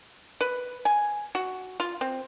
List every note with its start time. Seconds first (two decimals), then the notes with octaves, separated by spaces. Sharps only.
0.41 B4
0.85 G#5
1.35 F#4
1.80 F4
2.01 C4